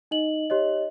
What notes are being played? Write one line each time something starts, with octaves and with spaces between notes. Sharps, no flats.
D#4 D#5 F#7
G4 C#5 D#5